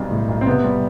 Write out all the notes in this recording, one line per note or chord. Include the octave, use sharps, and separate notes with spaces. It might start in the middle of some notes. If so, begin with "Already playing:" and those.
Already playing: B1 G3 C4
A2
B1
C4
C3 B3
G3